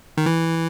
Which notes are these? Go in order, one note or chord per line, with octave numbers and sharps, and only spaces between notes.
D#3
E3